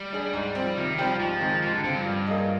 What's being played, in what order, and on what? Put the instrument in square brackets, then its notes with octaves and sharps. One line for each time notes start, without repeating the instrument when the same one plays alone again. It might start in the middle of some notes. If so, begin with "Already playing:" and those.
Already playing: [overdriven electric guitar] G3
[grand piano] D4 G#4
G#2
F3 C4
[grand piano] C3 [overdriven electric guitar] D#3
[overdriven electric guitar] F3 [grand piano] G3 C4 G4
[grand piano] G#2 [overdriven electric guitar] F3
[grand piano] D#3 G#3 C4 G4
[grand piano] G#2 [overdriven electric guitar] F3
[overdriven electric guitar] D3
[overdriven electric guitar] D3 [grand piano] F3 C4 F4
[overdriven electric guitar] G2
[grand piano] G3
A#3 F4 G#4 D#5